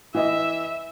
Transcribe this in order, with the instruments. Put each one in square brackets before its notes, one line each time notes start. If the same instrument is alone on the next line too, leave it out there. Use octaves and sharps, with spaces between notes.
[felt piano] E3 D#5 [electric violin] E5